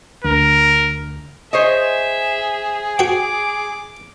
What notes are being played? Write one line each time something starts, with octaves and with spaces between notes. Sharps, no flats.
D2 A#4
G#4 C5 C#5 D#5 E5
F#4 G5 D6